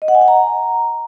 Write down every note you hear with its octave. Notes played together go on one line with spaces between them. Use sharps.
D#5
F#5
G#5
F#5
A#5